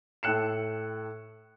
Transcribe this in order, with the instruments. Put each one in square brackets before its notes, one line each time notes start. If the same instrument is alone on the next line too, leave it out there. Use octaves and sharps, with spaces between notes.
[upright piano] A2 A4 G5 F#6 C#7 E7